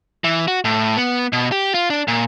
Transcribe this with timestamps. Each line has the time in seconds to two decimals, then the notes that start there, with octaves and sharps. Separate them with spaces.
0.24 E3
0.48 F#4
0.65 A2
0.97 B3
1.33 B2
1.52 G4
1.74 F4
1.90 D4
2.08 A#2